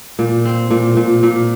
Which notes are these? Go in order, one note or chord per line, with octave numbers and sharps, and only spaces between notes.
A#2
C4
A#2
A#2
A#2